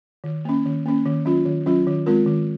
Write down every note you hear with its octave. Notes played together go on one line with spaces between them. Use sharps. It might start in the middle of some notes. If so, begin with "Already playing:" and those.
D#3
A#3 C#4
D#3
A#3 C#4
D#3
F#3 C#4 F4
D#3
F#3 C#4 F4
D#3
G#3 C4 F4 A#4
D#3